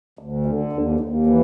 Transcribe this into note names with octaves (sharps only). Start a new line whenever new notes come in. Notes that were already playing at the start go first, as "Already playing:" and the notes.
D2
D3
D#2
D#2
E3